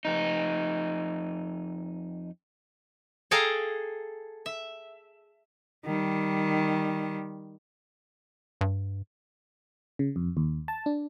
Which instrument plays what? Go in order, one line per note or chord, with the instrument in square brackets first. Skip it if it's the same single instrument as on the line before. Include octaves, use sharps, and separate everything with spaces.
[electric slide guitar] F2 D#4
[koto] G#4 A4 F5 G5 A#5
E5
[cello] D#3 G3
[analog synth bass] G2
[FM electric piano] C#3
F2
D#2
A5
D4